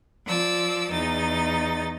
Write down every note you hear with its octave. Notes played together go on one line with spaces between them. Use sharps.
F3 D5 E6
E2 D#4 A6